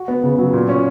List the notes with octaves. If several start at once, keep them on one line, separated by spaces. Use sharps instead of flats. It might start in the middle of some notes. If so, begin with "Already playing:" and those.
Already playing: F#4
B3
C#3
F#3
A#2
C#4